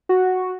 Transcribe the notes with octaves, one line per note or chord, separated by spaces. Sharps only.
F#4